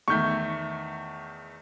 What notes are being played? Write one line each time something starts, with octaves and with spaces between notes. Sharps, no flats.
E2 D#3 A3 C#6 G6